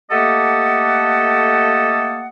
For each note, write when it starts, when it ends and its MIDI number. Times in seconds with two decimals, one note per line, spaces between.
0.11 2.27 57
0.11 2.27 58
0.11 2.27 67
0.11 2.27 69
0.11 2.27 75
0.11 2.27 78